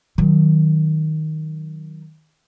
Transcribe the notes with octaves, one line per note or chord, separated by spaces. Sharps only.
D#3 F#3